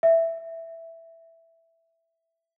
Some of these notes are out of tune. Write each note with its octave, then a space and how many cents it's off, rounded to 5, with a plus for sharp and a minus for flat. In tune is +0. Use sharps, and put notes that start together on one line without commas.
E5 +5